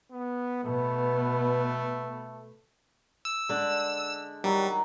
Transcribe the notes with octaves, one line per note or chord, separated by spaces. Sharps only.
B3
B2 A3 B3
E6
D3 G#3 D5
D#3 F#3 G3